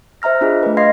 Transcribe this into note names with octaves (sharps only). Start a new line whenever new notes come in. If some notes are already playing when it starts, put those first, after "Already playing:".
C5 E5 A#5 F6 A#6
D4 F4 G#4 D#5
A3 B4
D#5 F5 C6 G#6 A#6 C7